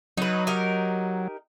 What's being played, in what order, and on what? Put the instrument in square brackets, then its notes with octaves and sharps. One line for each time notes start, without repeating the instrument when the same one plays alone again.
[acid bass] F#3 [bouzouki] D#4 B4
[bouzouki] D#4 G4 A#4